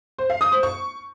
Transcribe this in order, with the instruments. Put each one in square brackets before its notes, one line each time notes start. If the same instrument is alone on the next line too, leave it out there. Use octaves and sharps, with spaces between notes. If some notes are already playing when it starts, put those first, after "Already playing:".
[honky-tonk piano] C5
F5
D#6
C5
C#6